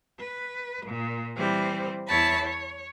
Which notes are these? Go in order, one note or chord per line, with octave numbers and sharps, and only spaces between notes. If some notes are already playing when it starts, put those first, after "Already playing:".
B4
A#2
E3 G3 C4 C5
E2 E4 C#5 A5 B5
C#5